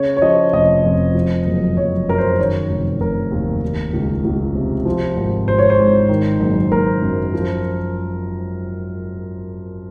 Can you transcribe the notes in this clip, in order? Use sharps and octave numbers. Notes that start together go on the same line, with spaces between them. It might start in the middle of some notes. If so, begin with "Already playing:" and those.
Already playing: C#3 C#5
C#5
F3 D#5
F1 D#5
F2
F3
F#1
F#1 C#5
F#2 A#4
C5
D#3 C#5
F1
F1 A#4
D#2
D#3
C#2
C#2
C3
F3
G#1
G#1 C5
C#5
C5
G#2
D#3
F#1
F#1 A#4
F#2
F3